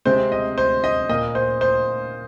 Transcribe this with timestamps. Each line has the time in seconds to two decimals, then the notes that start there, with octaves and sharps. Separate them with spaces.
0.06 C3 G#3 C4 C5
0.32 D#5
0.58 C5
0.84 D#5
1.09 A#2 A#3 D#5
1.35 C5
1.61 C5